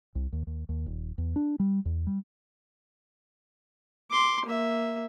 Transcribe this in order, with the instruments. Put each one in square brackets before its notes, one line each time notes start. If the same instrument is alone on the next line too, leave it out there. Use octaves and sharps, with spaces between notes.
[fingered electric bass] C2
D#2
D#2
D#2
D#1
E2
D4
G3
E2
G3
[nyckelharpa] C6 D6
A#3 E5